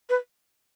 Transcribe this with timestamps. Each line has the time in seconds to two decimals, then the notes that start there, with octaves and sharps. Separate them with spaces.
0.09 B4